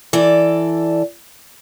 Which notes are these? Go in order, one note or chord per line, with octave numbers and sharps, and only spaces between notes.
E3 A4 D5